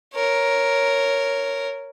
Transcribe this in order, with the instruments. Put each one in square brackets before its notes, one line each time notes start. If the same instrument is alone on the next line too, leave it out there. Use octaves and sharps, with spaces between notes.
[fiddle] A#4 C#5